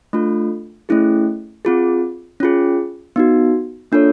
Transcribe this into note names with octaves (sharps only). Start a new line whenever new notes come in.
A3 D4 F4 A4
A3 C#4 E4 G#4
C4 F4 G#4
C#4 F4 G#4
B3 D#4 F#4
A#3 D4 F4 A4 C#5